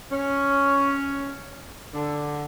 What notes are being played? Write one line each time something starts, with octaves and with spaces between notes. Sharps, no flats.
C#4
D3